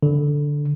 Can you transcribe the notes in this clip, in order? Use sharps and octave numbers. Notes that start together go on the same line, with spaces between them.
D3